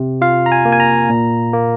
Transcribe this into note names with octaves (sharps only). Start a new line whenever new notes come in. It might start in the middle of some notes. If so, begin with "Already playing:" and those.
Already playing: C3
F4 F5
A#5
G#5
A#3
G#5
A#5
A#2
A#3